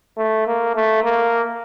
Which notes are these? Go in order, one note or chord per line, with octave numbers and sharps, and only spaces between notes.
A3
A#3
A3
A#3